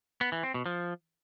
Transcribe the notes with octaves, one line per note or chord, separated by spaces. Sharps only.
B3
E3
C4
B2
F3